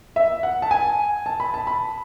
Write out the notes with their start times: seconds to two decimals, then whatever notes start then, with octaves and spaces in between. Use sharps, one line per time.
0.16 E5
0.43 F#5
0.62 A5
0.71 G#5
1.26 A5
1.40 B5
1.54 A5
1.67 B5